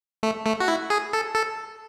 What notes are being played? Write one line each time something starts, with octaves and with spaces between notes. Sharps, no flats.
A3
A3
F#4
E4
G#4
A4
A4